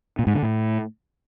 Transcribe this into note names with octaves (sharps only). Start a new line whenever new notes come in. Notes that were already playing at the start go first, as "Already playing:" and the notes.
A#2
G#2
D3
A2